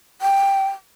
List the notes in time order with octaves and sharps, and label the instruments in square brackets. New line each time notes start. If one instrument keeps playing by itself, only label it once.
[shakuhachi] G5